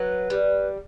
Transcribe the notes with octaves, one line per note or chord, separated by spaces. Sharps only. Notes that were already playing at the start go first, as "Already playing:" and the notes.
Already playing: F#3 B4
G3